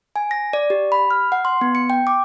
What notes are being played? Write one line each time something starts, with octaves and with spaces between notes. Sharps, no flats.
G#5
A#6
D5
G4
B5
F6
F#5
C6
B3
C#7
G5
D6